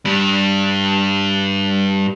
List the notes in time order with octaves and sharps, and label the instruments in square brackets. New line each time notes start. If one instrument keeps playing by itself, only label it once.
[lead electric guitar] G2 G3